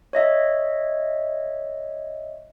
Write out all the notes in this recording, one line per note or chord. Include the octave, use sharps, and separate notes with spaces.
C#5 D#5 E5